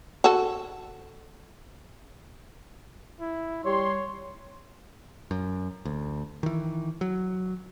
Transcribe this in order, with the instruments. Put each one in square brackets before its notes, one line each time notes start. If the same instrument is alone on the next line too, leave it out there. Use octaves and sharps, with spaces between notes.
[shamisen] F#4 A4
[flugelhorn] E4
[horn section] G3 C6 [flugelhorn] C#5
[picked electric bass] F#2
D2
D#3 E3
F#3